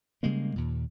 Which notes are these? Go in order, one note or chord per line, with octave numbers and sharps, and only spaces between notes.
C#3 G3 G#3 A#3
D#2 A#2